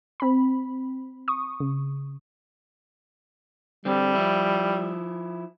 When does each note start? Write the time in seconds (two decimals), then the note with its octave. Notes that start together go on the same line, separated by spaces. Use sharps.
0.20 C4 B5
1.28 C#6 D#6
1.60 C#3
3.85 D3 G3 C4
4.15 F3 E4